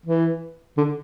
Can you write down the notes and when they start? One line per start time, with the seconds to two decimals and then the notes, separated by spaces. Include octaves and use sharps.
0.06 E3
0.77 D3